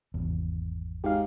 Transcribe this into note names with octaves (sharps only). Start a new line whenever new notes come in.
G#1 E2
G#2 G4 F5